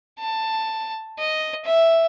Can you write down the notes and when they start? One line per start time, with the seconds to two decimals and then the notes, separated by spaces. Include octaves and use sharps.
0.20 A5
1.19 D#5
1.65 E5